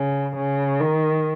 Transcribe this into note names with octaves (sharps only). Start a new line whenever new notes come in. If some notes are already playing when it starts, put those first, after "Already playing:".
Already playing: C#3
C#3
D#3